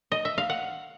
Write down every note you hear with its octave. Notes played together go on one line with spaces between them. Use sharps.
D#5
E5
F5
F#5